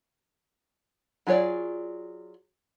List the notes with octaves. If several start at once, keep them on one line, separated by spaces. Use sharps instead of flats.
F#3 F4 G#4 C#5 D5